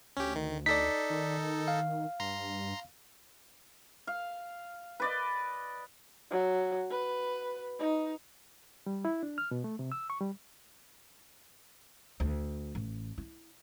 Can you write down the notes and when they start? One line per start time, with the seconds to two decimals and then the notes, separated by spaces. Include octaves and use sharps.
0.17 D2 C#4 G4
0.36 D#3
0.66 D#4 A4 D5 B6
1.10 D#3
1.68 F5
2.20 G2 A#5 C6
4.07 F5
5.00 B4 D5 D#5
6.31 F#3
6.91 B4
7.80 D#4
8.86 G3
9.05 E4
9.23 D4
9.38 F6
9.51 B2
9.64 A3
9.79 C3
9.92 E6
10.10 C#6
10.21 G3
12.20 D2
12.75 A1
13.18 E4